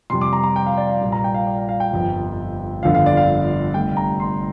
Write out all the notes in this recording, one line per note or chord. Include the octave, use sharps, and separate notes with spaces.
F2 C3 G3 C6
D6
A#5
A#5
G5
F5
D5
F5
A#1 A#2 G3
A#5
G5
F5
D5
F5
F5
G5
G1 F2 F3
G1 F2 D3 F3 F5
F5
D5
F5
F1 F2 D3 G3 G5
A#5
C6